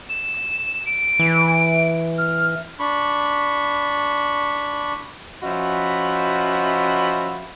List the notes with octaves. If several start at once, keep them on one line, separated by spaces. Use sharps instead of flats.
E7
D7
E3
F6
D4 B5 C#6
F3 C#4 F#4 D#5 E5 B5